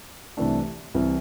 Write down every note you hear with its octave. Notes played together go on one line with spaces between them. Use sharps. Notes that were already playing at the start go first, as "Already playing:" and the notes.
C2 C3 E3 A3 D4
C2 C3 E3